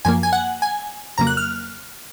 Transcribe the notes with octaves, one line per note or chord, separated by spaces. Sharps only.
F#2 F3 A#3 G#5
G#5
F#5
G#5
F2 C#3 F#3 A#3 A#5
F#6
F6